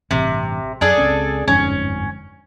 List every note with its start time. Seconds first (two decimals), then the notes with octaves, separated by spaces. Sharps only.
0.11 A1 G2 C3
0.81 F#2 D4 G#4 A4
0.98 C#2 C4 C#4
1.48 G1 F2 G#2 C#4